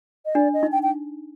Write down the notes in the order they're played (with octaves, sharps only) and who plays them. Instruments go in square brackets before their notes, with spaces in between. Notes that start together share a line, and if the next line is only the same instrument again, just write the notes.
[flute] D#5
[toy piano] D4 [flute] D5
[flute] D#5
[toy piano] D#4
[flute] G5
G5